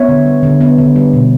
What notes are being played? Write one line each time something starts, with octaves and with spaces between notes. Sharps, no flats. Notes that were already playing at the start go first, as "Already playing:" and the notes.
Already playing: B3 C#5 E5
D3
G3
D3
B3
D3
G3
B2